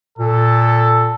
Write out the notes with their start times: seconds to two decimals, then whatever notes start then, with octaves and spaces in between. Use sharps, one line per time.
0.18 A#2 A4